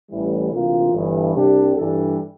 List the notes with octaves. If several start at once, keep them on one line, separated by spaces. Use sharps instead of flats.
A1 A2 E3 G3
D2 C3 E3 A#3 F4
G1 G2 E3
C2 C3 G3 D4 G4
G2 E3 G3 D4 A4